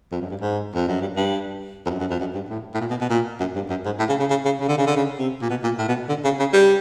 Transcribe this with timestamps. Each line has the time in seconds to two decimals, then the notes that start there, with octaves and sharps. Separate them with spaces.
0.12 F2
0.21 F#2
0.31 G2
0.41 G#2
0.74 F2
0.88 F#2
1.01 G2
1.16 G2
1.86 F2
1.90 F#2
2.00 F#2
2.10 F2
2.20 F#2
2.35 G2
2.50 A2
2.74 A2
2.80 A#2
2.90 B2
3.01 B2
3.10 A#2
3.40 F#2
3.55 G2
3.70 F#2
3.85 G#2
3.99 A2
4.09 C#3
4.19 C#3
4.30 C#3
4.45 C#3
4.60 C#3
4.69 D3
4.78 C#3
4.87 D3
4.96 C#3
5.19 C3
5.42 A#2
5.50 B2
5.64 A#2
5.79 A2
5.89 B2
6.09 D3
6.24 C#3
6.39 C#3
6.53 G3